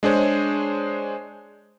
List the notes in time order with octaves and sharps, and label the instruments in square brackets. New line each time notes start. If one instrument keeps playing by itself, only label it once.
[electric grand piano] G#3 D4 G#4 C5 C#5